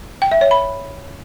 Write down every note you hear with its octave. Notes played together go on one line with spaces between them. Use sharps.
G5
E5
C#5
B5